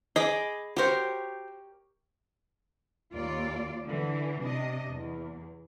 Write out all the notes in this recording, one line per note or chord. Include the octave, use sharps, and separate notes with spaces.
G#4 D#5 B5 D6
F#4 G4 A#4 C5 C#5
D#2 F4 D5
D3 E3
C3 D4 D#5
E2